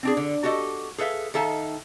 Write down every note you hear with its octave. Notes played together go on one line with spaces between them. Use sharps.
C4 D4 G#4
D3
F#4 G4 A4 D#5
G#4 A4 B4 E5 F5
D#3 D#4 A4 E5 F5 A5